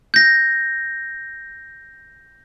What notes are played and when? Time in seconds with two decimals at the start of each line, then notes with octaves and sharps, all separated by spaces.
0.14 G6 A#6